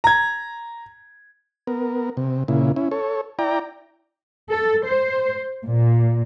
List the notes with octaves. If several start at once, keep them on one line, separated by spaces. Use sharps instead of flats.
A#5 G#6
B3 A#4
C3
A#2 C#3 E4
C#4 E4
A4 C#5
E4 D5 G5 A#5
A4
C5
A#2